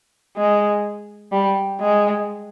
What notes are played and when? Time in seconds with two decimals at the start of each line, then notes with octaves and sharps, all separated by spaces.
0.37 G#3
1.32 G3
1.80 G#3